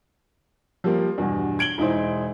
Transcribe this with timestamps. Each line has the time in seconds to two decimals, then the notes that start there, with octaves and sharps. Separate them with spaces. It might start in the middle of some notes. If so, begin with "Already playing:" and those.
0.84 F3 G3 A#3
1.18 E2 G2 B2
1.59 G#6 D7 F#7 G7
1.78 E1 D#4 E4 C5